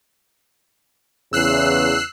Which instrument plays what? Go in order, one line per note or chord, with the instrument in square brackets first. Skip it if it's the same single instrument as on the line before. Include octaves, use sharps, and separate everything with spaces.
[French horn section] E2 [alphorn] C#3 [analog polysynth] E6 F#6 C7